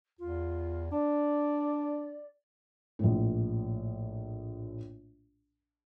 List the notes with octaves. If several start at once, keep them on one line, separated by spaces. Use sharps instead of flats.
E2 F4
D4 D5
A#1 A2